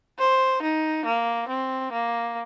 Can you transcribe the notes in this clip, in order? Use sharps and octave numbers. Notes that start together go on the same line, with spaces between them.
C5
D#4
A#3
C4
A#3